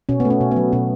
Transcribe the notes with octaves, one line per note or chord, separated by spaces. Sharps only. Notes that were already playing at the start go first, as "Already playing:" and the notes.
B2 C#4
B3
A3
C#4
B2
F#3 B3
B2 C#4